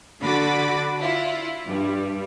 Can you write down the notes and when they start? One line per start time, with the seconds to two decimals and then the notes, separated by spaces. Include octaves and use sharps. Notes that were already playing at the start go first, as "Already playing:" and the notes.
0.21 D3 F#4 B5 D6 A6
1.00 E4 F4
1.67 G2 G3